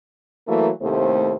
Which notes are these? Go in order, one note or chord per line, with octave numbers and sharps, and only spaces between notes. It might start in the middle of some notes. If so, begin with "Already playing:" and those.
E3 F#3 A3 A#3
D#2 A2 C3 A3 C5